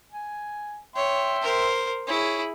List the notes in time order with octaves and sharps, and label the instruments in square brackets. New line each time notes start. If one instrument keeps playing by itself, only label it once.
[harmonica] G#5
[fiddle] C#5 [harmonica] E5 G5 C6
[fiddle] A#4 C5
[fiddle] E4 G#4 [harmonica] C#5